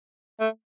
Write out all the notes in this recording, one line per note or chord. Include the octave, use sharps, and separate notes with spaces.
A3